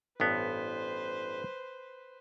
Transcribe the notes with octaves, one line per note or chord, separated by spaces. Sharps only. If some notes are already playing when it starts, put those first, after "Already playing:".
A1 G2 B3 B4 C5